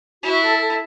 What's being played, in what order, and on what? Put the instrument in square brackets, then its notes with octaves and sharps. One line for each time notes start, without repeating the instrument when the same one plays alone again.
[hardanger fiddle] E4 [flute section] F#4
[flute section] A4
A4